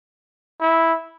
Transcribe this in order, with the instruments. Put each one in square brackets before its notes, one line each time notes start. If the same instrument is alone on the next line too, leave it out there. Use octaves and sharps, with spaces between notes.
[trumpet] E4